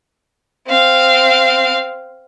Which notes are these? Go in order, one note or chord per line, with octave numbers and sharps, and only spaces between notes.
C4 F5